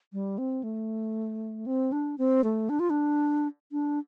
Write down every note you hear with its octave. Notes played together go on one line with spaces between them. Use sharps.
G3
C4
A3
C4
D4
C4
A3
D4
F4
D4
D4